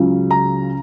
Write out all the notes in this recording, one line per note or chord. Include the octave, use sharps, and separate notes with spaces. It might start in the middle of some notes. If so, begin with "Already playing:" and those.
Already playing: C#2 C#3 F#3
A#5